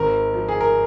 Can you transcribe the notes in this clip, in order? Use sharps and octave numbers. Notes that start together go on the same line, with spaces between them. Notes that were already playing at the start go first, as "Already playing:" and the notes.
Already playing: G#1 A#4
F3
G#4
A#4